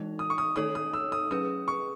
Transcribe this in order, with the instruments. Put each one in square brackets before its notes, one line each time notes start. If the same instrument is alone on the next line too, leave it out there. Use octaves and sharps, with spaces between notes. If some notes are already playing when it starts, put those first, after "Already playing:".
Already playing: [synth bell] E3 G#3 D#4
[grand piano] D#6
C#6
D#6
[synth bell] D#3 A3 D#4 A4 C#5 [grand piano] D#6
[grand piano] D#6
E6
D#6
[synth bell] F#3 C#4 G#4 B4 [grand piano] D#6
[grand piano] C#6